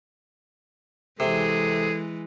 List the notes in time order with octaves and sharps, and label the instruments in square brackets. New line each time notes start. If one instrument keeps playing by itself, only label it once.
[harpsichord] C3 [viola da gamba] E3 G#3 [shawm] G#4 [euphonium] A4